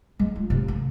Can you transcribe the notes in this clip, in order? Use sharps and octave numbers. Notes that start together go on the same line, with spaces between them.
G#3
F4
C3
A3